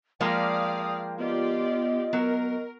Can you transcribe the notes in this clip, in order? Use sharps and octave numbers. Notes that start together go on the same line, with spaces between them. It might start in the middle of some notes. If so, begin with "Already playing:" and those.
F3 G#3 A#3 D5 F5 G5 D#6
B3 F4 G4 D5 D#5
F#3 B3 A#4